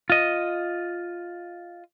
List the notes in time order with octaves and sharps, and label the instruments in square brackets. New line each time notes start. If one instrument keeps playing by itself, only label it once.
[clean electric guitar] F4 D#5